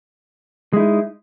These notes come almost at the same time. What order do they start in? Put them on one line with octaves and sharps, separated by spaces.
G#3 E4 D#4